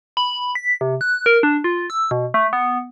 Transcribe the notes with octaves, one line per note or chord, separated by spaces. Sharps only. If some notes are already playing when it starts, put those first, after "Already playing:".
B5
B6
C3
F#6
A#4
D4
F4
E6
B2
A3
B3